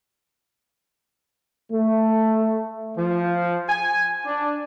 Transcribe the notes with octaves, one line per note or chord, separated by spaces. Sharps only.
A3
F3
G#5
D4